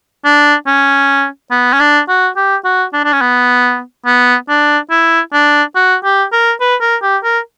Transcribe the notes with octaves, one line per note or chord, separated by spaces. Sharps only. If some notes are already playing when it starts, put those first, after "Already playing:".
D4
C#4
B3
C#4
D4
F#4
G4
F#4
D4
D4
C#4
B3
B3
D4
E4
D4
F#4
G4
A#4
B4
A#4
G4
A#4